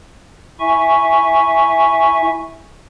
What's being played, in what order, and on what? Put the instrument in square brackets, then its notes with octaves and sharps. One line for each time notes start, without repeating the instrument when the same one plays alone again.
[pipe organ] E4 E5 G#5 C#6